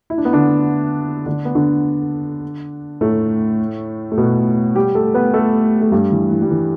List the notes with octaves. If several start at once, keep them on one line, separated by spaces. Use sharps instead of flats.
E4
D4
B3
D3 D4
D3 D4
B3
D3 D4
A2 A3
A3
B2 B3
G3 G4
A3 A4
B3 B4
A3 A4
A3
G2 G3
E3
E3
G3
E3